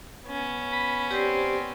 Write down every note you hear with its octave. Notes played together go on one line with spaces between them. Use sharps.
B3 C#4
B5
C4 G4 C5 D5